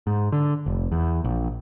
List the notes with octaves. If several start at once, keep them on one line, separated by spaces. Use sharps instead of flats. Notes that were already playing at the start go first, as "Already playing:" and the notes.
G#2
D3
F1
E2
A#1